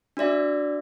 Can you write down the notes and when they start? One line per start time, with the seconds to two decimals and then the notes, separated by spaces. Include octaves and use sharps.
0.17 D4 F#4 D5 E5